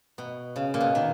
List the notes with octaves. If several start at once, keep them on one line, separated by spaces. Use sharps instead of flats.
B2
C#3
A#2
B2
D#3